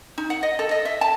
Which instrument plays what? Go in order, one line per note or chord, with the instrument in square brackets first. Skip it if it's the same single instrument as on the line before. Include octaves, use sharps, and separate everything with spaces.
[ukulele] D#4
F#5
D#5
A4
D#5
E5
A5